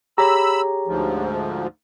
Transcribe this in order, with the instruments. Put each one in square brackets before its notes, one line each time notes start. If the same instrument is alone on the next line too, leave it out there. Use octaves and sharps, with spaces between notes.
[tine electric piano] G4 G#4 C#5 [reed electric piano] A#5 [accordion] B5 E6
[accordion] D2 G#2 F3